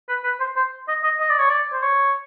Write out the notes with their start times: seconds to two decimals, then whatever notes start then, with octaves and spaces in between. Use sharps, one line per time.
0.08 B4
0.24 B4
0.40 C5
0.56 C5
0.88 D#5
1.04 D#5
1.20 D#5
1.30 D5
1.39 C#5
1.49 D5
1.73 C5
1.83 C#5